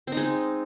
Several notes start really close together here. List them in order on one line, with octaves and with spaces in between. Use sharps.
C4 D#4 G#3